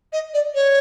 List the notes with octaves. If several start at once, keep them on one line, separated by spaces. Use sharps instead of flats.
D#5
D5
C#5